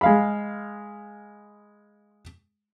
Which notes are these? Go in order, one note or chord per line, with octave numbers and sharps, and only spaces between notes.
G#3 F5 B5